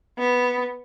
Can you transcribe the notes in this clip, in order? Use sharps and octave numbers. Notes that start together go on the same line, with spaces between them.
B3